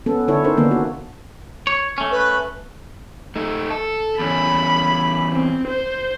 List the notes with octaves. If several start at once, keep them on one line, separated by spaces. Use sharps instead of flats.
B3 C#4 A4
D3 D4 E4 A4 C#5
C#4 D#4 A#4 C5
D3 D#3 A#3 B3 D4
F#4
C#5
A3 C#4
B4
A3 D#4
A4
E2 C#4 B5
C4
C5